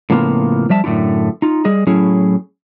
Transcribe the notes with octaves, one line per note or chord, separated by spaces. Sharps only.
A2 C#3 F3 A#3 B3 F4
F3 G3 E5 A5
F#2 A2 D3 A3 E4
D#4 F4
G3 G#4 D#5
A2 F#3 C#4 E4 G#4